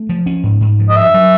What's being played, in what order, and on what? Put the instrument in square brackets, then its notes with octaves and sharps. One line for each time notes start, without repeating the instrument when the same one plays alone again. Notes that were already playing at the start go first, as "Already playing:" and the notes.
Already playing: [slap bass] A3
F3
C#4
G#2
G#2
F3
[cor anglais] D#5
[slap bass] G2 [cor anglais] E5
[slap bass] F#3